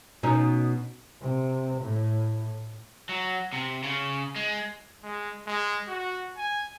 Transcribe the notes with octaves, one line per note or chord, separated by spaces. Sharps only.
B2 C#4 D#4
C3
A2
F#3
C3
C#3
G#3
G#3
G#3
F#4
G#5